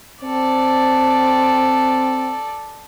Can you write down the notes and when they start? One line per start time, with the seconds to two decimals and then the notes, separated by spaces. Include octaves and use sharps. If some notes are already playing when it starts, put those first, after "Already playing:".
0.23 C4 A4 D5